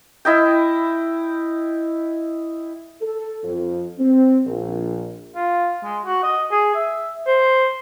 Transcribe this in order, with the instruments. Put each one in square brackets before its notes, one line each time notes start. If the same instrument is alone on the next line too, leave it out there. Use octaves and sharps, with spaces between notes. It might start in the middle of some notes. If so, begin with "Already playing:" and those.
[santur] E4 D#5 G5
[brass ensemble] A4
F2
C4
A#1
[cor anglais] F4
G#3
F#4
D#5
G#4
E5
C5